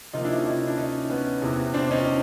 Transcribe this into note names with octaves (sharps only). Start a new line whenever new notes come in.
C3 F3 A#3 D#4 F4
D4 E4
C#4 D#4
D4 E4
D4
C#4 D#4
B3 C#4
E2 C3 E3
C4 D4
C#4 D#4